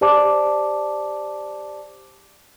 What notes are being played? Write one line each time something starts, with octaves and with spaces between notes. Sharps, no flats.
G4 C5 D5 A5 D6